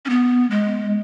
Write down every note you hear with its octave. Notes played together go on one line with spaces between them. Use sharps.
C#4
B3
G#3